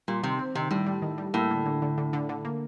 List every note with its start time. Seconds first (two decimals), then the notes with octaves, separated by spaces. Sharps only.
0.08 A#2 G3
0.23 C3 D#3
0.39 C4
0.55 C3 D#3
0.71 A2 G3
0.87 G3
1.02 D#3
1.18 G3
1.34 A2 A#3
1.50 D3
1.66 D3
1.82 D3
1.98 D3
2.13 D3
2.29 D3
2.45 A#3